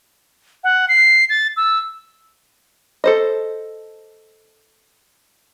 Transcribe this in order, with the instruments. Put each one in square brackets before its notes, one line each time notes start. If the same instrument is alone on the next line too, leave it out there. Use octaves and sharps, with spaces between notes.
[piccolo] F#5
C7
A6
E6
[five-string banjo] A4 C5 D#5